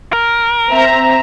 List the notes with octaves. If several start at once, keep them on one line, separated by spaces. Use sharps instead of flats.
A#4
C4 E5 A#5